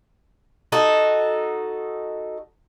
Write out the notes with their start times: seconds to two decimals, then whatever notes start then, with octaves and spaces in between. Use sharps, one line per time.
0.72 D#4 F#4 A4